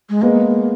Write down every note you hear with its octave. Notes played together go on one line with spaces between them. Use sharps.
G#3
G#3 A#3 B3